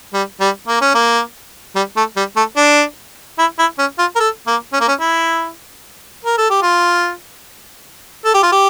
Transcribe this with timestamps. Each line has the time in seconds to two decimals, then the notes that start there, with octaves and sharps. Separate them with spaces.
0.14 G3
0.40 G3
0.68 A#3
0.81 C#4
0.94 A#3
1.76 G3
1.96 A3
2.17 G3
2.36 A3
2.57 D4
3.38 E4
3.59 E4
3.79 C#4
3.99 F4
4.16 A#4
4.20 A4
4.47 A#3
4.73 C#4
4.81 A#3
4.88 C#4
5.00 E4
6.25 A#4
6.38 A4
6.50 G4
6.62 F4
8.25 A4
8.34 G4
8.43 F4
8.52 G4